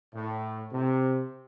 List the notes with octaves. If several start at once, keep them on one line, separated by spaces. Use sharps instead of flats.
A2
C3